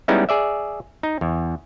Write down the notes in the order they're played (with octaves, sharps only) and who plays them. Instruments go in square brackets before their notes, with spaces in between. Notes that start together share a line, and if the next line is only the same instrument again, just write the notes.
[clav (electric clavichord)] G3 G#3 B3 C#4 D#4 E4
G#4 D5 E5
D#4
E2